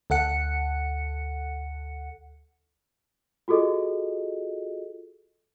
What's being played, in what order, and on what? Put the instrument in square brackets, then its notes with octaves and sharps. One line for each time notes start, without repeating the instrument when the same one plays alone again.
[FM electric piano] D2 A4 F#5 C#7
[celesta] F4 F#4 G#4 A4 D#5